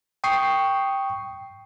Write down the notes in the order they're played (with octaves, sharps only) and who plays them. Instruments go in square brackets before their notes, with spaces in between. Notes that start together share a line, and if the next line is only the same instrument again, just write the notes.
[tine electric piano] G5 C#6 D#6 C7